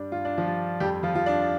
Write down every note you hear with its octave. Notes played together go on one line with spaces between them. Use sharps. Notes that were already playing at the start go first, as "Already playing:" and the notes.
Already playing: G2 G3 D4
G2 F4
D4
F3 F4
G3
F2 G3 G4
F3 F4
F3 F4
D4